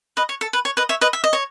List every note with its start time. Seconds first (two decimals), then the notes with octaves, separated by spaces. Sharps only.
0.17 B4 D#5
0.29 C#5
0.41 A4
0.53 B4
0.65 C#5
0.77 B4 D#5
0.89 C#5 E5
1.01 B4 D#5
1.13 E5
1.24 D#5
1.33 C#5